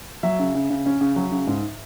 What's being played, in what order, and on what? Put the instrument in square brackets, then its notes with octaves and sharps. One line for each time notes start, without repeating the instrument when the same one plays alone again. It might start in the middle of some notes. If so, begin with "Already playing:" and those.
[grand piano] F#3 E5
C#3
C#3
C#3
C#4
C#3
F#3
C#3
G#2